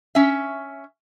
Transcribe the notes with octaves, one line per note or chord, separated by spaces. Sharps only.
C#4 E5